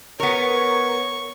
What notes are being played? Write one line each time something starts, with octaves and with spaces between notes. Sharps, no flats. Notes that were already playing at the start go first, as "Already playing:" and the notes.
B3 A#4 C#5 C#6